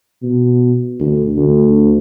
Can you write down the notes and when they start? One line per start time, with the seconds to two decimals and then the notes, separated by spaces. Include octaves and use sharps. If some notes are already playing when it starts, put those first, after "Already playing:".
0.22 B2
1.00 D2
1.37 D2